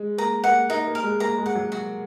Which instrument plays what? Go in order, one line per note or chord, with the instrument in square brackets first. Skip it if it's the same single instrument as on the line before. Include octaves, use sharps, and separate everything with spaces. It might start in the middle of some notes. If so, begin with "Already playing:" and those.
Already playing: [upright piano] G#3
[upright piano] A#3 [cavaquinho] A#5
[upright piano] A#3 [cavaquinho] F#5
[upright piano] A#3 [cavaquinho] D#4
[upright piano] A#3
[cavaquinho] A#4
[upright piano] G#3
[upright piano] A#3 [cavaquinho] A#5
[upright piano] G#3
[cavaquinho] F#5
[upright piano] F#3
[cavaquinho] F#4